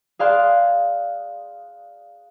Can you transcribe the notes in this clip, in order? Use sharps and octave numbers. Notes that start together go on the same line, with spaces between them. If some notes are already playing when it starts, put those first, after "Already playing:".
G#4 D5 F5 A5 C6 F#6